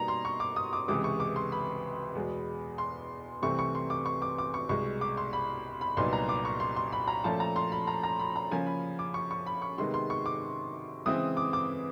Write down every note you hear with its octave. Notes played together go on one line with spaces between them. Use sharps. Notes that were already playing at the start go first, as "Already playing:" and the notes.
Already playing: B2 G3 A#3 D#4 A#5
C6
C#6
D6
D#6
D6
C#2 C3 E3 G#3 D6
C#6
D6
C6
B5
E2 B2 G#3
C6
C2 C3 E3 A3 C4 C#6
C#6
C6
D6
C#6
D6
D6
C#6
C2 B2 G#3 C#6
D6
C6
B5
B5
C2 A#2 F#3 B3 D#4 C6
A#5
D6
C#6
C6
C6
B5
A#5
A#2 F3 A3 C#4 A5
A#5
C6
B5
A#5
A#5
B5
A#5
C#3 F3 A#3 C#4 G#5
B5
D6
C#6
C#6
B5
C#6
C3 D#3 G#3 B3 C6
C6
C#6
D6
C#3 E3 G#3 C4 E4 D#6
D6
D6